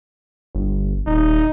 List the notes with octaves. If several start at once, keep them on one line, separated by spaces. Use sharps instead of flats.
G1
D#1 D#4